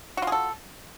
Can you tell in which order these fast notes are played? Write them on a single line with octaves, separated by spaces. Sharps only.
F#4 F4 G#4 A4